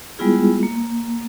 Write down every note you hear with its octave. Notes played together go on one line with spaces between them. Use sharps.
G3 G#3 B3 E4 F4 G#4
A#3